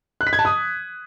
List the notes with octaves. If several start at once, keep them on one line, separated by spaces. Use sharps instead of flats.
F#6
B6
G#6
A5
D#6